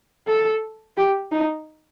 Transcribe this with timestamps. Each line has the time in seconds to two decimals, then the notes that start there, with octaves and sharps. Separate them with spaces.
0.27 A4
0.97 G4
1.32 D#4